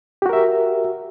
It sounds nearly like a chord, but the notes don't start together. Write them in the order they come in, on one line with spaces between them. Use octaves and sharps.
G4 F#4 A#4 E5